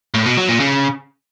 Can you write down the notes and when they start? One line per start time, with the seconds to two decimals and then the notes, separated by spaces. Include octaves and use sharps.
0.14 A2
0.26 B2
0.37 F#3
0.49 A#2
0.60 C#3